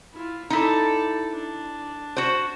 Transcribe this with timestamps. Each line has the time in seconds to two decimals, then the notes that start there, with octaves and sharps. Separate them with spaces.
0.13 E4 F4
0.50 D#4 E4 A4 D5
1.32 D4
2.17 F#4 C5